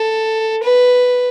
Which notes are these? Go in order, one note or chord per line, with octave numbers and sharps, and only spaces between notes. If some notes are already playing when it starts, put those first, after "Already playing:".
Already playing: A4
B4